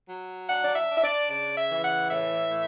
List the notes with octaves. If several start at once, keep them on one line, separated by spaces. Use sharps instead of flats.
F#3
D4 F#5
D5
E5
D4
E5
D5
C#3 D5
E5
E3
F#5
A2 E5
A2